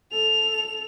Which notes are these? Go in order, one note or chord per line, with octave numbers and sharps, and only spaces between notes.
A4 F7